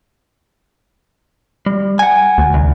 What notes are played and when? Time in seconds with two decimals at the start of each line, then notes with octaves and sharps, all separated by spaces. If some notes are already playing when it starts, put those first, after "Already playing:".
1.66 G3
1.99 F#5 G#5
2.38 D2
2.54 C2